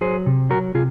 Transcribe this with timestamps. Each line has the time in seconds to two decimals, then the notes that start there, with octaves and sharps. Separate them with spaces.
0.01 F#3 G#4 C5
0.26 C3
0.50 F#3 F#4 A#4
0.75 C3 F4 G#4